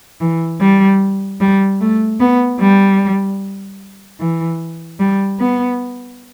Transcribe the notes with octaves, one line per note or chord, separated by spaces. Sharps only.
E3
G3
G3
A3
B3
G3
E3
G3
B3